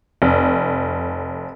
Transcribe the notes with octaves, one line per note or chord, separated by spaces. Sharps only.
F1